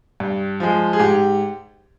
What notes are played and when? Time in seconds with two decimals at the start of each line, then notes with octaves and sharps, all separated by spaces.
0.20 G2
0.60 F3 G#3
0.93 G#4
1.00 G#2 G4